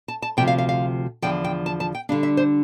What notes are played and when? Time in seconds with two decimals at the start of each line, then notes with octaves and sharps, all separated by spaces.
0.08 A5
0.22 A5
0.37 D2 C3 F3 G5
0.48 F5
0.58 F5
0.69 F5
1.22 E2 D3 F3 G5
1.44 G5
1.66 A5
1.80 A5
1.95 G5
2.09 D3 G3 D4 F5
2.23 E5
2.37 C5